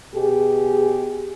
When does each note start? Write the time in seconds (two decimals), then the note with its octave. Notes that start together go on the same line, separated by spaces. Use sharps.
0.15 B2 G4 G#4